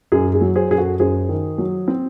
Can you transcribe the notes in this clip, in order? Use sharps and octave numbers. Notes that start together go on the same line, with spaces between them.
F#2 G#4
G#4
F#3
G#4 C5
F#2 G#4
F#4 A4
F#2 G#4 C5
D#3
F#3
C4